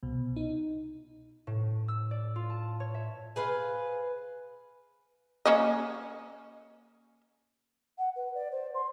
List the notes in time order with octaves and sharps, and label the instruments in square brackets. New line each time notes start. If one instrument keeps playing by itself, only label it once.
[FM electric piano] C2 B2
D#4
[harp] A2
E6
D5
F4
A5
C#5
E5
[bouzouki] G#4 B4 C5 F5
[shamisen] A#3 C#4 D#5
[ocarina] F#5
B4
D5
C5
C6